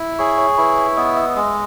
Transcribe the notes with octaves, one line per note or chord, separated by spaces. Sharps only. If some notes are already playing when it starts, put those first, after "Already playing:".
Already playing: E4
G#4 C#5 C#6
C#5 C#6
C#6
E4 B4 B5
C#5 C#6
B3 D#5 D#6
E5 E6
G#3 D#5 D#6